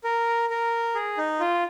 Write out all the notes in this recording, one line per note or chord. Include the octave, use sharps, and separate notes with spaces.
A#4
A#4
G#4
D#4
F4